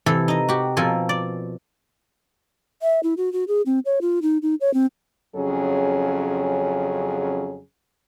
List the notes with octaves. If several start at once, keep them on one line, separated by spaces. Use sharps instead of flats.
C3 E3 A4
D#4 D#5
F#4 G4
B2 F3 C4 A4 A#4 G#5
D5
E5
E4
F#4
F#4
G#4
C4
C#5
F4
D#4
D#4
C#5
C4
F2 C#3 F#3 C#4 G#4